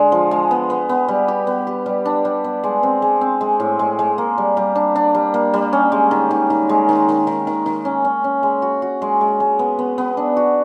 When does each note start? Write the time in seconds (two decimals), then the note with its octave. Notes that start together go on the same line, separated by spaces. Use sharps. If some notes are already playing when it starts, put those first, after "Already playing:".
Already playing: D3 G#3
0.12 F3
0.31 G#3
0.51 B3
0.70 B3
0.89 B3
1.08 G3
1.28 G4
1.47 B3
1.67 G4
1.86 G3
2.05 D4
2.25 G3
2.44 B3
2.64 G#3
2.83 C4
3.02 G#3
3.21 C4
3.41 G#3
3.60 A2
3.79 G#3
3.99 G#3
4.18 A#3
4.38 G3
4.57 G3
4.76 D4
4.96 D4
5.15 G3
5.34 A#3
5.54 G3
5.73 C#4
5.92 G#3
6.11 D#3
6.31 D#3
6.50 D#3
6.69 G#3
6.89 D#3
7.08 D#3
7.27 D#3
7.47 D#3
7.66 D#3
7.85 C#4
8.05 C#4
8.24 C#4
8.43 G#3
8.62 F#4
8.82 F#4
9.02 G#3
9.21 G#3
9.40 G#3
9.59 B3
9.79 B3
9.98 B3
10.17 D4
10.37 F#4